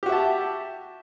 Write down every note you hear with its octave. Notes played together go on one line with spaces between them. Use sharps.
F#4 G4 E5 A5